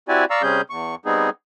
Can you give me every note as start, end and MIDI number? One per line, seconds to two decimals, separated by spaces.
0.09 0.25 60
0.09 0.25 64
0.09 0.25 66
0.09 0.25 67
0.09 0.25 74
0.09 0.25 80
0.30 0.42 74
0.30 0.42 77
0.30 0.42 82
0.30 0.42 85
0.30 0.42 88
0.42 0.61 48
0.42 0.61 55
0.42 0.61 61
0.42 0.61 68
0.42 0.61 91
0.70 0.95 40
0.70 0.95 85
1.06 1.30 55
1.06 1.30 59
1.06 1.30 60
1.06 1.30 63
1.06 1.30 68